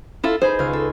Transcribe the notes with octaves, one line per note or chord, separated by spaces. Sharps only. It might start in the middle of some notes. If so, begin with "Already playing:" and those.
E4 F4 A4
D#4 G#4 B4 C5
C#2 F5
A4